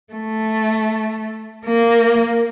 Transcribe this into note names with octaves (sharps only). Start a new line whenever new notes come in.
A3
A#3